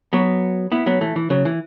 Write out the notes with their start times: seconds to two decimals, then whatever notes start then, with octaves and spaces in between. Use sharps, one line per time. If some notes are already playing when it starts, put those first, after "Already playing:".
0.13 F#3 B3
0.72 B3 E4
0.86 F#3 B3
1.01 E3 A3
1.16 E3
1.30 C#3 F#3
1.45 E3